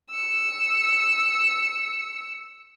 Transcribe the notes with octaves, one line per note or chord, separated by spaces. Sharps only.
E6 C#7